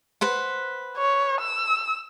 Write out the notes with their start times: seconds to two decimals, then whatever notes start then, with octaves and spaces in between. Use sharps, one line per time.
0.21 B4 C5 F#5
0.98 C#5
1.41 E6